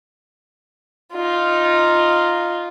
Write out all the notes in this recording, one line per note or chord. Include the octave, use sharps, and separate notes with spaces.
D#4 F4